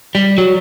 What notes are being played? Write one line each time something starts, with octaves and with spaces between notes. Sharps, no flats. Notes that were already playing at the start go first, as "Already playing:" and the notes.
G3
F#3